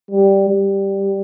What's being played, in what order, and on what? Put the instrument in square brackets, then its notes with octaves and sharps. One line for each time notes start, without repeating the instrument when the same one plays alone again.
[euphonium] G3
G3